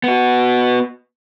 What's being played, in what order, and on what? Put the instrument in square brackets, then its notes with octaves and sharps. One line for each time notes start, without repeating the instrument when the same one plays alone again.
[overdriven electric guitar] B3 F#4